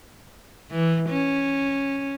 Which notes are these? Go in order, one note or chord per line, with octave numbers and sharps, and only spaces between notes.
E3
C#4